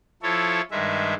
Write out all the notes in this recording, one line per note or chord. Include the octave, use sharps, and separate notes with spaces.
F3 E4 A4 C#5
G2 D#3 G#3 E5